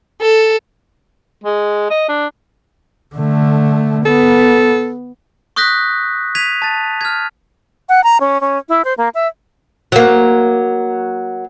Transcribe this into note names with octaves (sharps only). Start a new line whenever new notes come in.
A4
G#3
D#5
D4
D3 A3
B3 A4
C#6 D#6 F#6 G6 A#6 B6
G#6 B6 D#7 F7
A5 A6
F6 G#6
F#5
A#5
C#4
C#4
E4
C5
A#3
E5
F#3 A#3